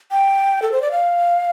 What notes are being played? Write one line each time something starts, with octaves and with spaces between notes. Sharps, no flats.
G5
A4
C5
D5
F5